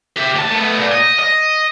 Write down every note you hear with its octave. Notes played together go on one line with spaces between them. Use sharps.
G4 E5
D#2 A5
A3 B3
A#2
D#5
D#5